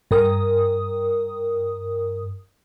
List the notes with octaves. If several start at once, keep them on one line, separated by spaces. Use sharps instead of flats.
G2 A#4 D#6